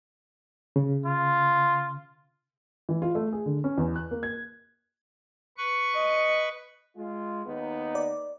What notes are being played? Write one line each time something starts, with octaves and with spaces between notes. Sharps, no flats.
C#3
F4
E3
F4
A3
G#4
D3
C#4
E2
F#6
A#3
G#6
B4 C#6
D#5
G#3 F4
D#2 B3 D#4
D5